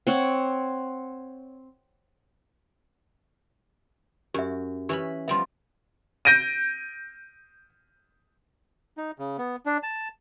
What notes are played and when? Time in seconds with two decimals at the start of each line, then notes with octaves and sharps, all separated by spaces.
0.07 C4 C#5 F#5
4.34 F#2 G4 E5
4.89 E3 C#4 G4 B5
5.28 F3 G3 B3 E5 C6
6.25 G6 A#6 D7 D#7
8.97 D#4
9.19 C#3
9.38 B3
9.66 D4
9.83 A5